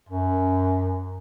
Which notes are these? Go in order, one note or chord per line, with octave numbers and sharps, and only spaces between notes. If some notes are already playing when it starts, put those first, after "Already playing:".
F#2